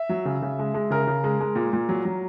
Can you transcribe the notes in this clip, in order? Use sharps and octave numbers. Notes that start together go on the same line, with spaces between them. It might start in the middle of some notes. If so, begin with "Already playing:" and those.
Already playing: E5
F#3
C#3
C#3
G#3
G#3
C#3 A#4
C#3
G#3
G#3
A#2
A#2
F#3
F#3